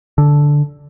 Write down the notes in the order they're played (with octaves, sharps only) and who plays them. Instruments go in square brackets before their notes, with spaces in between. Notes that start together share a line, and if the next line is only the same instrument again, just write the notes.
[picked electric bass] D3